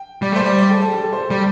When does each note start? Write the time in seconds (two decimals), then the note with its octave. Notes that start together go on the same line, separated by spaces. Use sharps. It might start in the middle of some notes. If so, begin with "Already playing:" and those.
Already playing: G5
0.22 G3 D5
0.32 A3 C5
0.41 G3 D5
0.58 D5
0.70 A4
0.82 A4
0.94 G4
1.04 A4
1.13 C5
1.21 A4
1.30 G3 D5